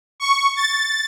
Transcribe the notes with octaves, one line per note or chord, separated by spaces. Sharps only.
C#6
A6